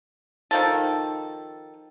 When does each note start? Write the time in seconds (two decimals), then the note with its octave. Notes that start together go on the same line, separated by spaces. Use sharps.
0.51 D#3 F3 A4